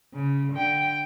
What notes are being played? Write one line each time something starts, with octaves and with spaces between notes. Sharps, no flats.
C#3
D3 G5